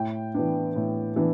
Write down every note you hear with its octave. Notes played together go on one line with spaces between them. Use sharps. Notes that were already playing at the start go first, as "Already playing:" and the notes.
Already playing: A2 G5
E3 B3 D4
A2
E3 B3 D4